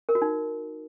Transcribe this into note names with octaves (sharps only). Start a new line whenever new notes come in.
A#4
F#4
D#4